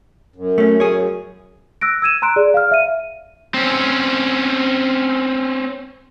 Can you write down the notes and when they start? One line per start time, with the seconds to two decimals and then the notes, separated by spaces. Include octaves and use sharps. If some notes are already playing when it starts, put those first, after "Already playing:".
0.36 F#2
0.58 A3 C#4
0.80 G#4 C#5
1.81 E6 F#6 A#6 D7
2.02 E6 G#6 D#7 E7
2.22 A#5 C6 F#6 D7
2.36 G#4 D5
2.54 F5 F6
2.71 E5 D#7
3.54 C4 C#4